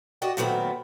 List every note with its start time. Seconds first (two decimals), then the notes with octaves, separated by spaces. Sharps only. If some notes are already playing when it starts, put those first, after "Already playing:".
0.22 F#4 D5 D#5 G5
0.37 A#2 D#3 F#3 A3 B3 C4